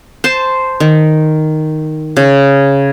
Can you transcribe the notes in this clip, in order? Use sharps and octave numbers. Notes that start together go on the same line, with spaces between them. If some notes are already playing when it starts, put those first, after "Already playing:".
C5 A5
D#3
C#3